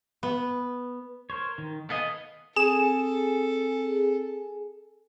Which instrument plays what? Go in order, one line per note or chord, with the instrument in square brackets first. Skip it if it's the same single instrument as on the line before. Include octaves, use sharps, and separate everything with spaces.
[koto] B3
[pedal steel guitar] A#4 C5 C#5
D#3
[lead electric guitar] B3 D#5 [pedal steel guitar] A4 F5 G#5
[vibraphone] C4 [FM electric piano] G#4 [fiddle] A4 [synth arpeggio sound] E7